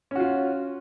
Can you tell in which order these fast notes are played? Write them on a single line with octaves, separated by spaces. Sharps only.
C#4 F#4 F4